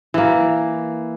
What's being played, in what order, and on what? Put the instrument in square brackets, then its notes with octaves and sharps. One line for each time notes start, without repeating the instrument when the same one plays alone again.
[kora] E3 A#3